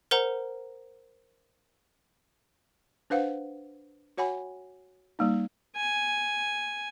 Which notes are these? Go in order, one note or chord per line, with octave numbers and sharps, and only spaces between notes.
A#4 C5 F#5 A#5
D4 B4 C5 F5 F#5
F#4 C#5 F#5 G#5 B5
G3 A#3 D#4
G#5